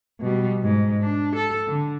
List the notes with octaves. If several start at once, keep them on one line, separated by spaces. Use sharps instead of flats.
B2 G3
G#2
D4
A4
D3